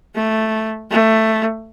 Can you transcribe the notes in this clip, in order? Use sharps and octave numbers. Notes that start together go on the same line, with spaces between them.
A3
A3